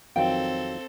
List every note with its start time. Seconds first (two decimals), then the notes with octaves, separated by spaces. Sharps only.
0.16 F2 D#3 F#3 C4 A4 F5 G5